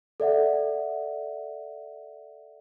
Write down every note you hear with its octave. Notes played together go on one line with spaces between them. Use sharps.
A4 D5 E5 F#5